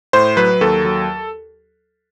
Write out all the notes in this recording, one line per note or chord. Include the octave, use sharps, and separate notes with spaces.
A2 C5
F#3 B4
D#2 A4
F#3